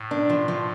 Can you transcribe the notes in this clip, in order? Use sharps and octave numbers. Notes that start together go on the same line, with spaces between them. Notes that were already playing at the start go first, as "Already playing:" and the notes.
Already playing: A2
D4
F3
F3